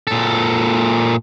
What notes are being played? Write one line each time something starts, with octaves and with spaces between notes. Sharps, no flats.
A#2 A4